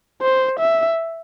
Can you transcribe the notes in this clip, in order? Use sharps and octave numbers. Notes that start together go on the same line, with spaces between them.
C5
E5